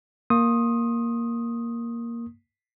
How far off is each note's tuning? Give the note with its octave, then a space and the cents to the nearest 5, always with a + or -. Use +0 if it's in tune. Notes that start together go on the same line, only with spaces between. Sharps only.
A#3 +0 C6 +45 D#6 +0